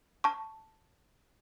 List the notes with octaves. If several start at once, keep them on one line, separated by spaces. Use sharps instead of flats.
A5 C#6